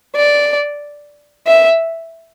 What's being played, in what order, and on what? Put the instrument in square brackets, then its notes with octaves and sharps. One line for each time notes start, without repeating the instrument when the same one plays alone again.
[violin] D5
E5